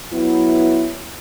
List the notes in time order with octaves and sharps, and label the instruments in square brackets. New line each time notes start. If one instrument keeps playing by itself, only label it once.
[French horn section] F#3 B3 E4